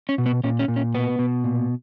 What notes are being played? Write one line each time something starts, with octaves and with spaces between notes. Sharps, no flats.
C#4
B2
B3
A#2 C#4
C#4
A#2
C#4
B2 B3
B2
A#2